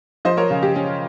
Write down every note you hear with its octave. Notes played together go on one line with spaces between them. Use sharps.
F3 C5 D#5
A#4 C#5
C#3 F4
G4
C#4